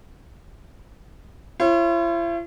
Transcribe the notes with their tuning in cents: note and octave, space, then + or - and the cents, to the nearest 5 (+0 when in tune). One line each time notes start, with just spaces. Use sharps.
E4 +45 C#5 -45